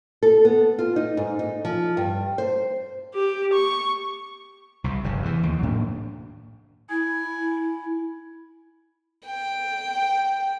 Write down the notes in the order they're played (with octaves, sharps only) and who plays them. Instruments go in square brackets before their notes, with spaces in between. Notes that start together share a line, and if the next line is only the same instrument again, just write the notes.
[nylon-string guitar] A4
B3
F4
D#4
G#2
D#4
F3
G2
C5
[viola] G4
C#6
[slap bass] C2 C3
F1 G2 C#3
E2 E3
D#2
A2 F#3 A#3 D4
[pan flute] E4 [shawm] G#5
[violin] G5